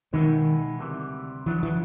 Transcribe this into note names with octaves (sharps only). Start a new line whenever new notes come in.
B2 D#3 G#3 B3 E4
D2 C3 E3 G3
F#2 C#3 E3 F#3 B3 D4
E3